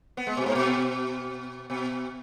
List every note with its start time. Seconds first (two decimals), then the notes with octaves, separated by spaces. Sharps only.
0.17 B3
0.27 G#3
0.37 B2
0.46 G#2
0.55 B2
1.70 B2